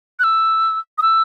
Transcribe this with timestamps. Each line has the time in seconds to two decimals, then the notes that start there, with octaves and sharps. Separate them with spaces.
0.19 F#6
0.24 E6
0.98 D#6
1.02 E6